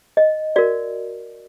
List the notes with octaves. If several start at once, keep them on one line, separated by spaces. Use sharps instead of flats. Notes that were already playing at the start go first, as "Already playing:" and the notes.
D#5
F#4 A#4 D5